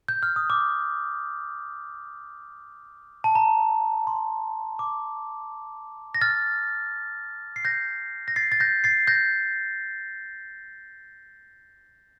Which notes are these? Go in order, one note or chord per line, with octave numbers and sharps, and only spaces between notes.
G6
F6
D#6
D6
A5
A#5
C6
D6
A#6
F6 A6
C7
G6 A#6
A#6
A6 C7
A6
G6 A#6
A6 C7
G6 A#6